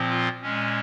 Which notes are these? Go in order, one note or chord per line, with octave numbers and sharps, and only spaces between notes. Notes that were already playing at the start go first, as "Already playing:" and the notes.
Already playing: A#2 F3 C4
F4
A#2 G#3 C#4